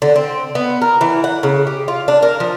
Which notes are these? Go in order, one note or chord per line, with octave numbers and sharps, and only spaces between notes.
D3
C4
B3
A#4
E3
F#5
C#3
G4
F4
D4
A#4
F3